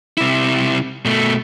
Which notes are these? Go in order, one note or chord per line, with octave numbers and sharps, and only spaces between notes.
C3 E4
B2 A3